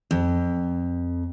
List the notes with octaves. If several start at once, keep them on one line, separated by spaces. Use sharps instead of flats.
F2